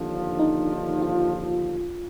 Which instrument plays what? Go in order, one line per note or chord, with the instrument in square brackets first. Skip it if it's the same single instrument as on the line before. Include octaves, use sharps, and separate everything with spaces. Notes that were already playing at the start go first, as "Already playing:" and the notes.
Already playing: [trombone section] D#2 D3 F3 [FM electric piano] D4
[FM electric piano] D#4
F4